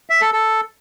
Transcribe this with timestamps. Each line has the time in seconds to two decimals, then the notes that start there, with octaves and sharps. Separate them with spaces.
0.10 E5
0.21 A4
0.33 A4